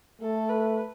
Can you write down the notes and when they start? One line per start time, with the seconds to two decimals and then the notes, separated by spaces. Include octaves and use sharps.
0.21 A3 A4
0.49 B4